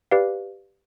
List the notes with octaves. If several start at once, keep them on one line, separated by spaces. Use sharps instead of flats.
G4 B4 D5 F5